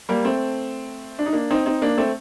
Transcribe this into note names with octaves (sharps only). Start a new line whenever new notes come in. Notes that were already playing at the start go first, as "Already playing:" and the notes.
G3 A#3
A3 C4
D4
D#4
A#3 D4
C4 D#4
C4 D#4
A#3 D4
A3 C4